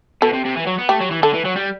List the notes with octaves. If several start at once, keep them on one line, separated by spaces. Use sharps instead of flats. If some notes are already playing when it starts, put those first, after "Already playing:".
B2 A4
C3
C3
E3
F#3
B3
A3 G4
F#3
E3
D3 A4
E3
F#3
G3